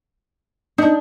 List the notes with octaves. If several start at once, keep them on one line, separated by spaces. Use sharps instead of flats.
D4 D#4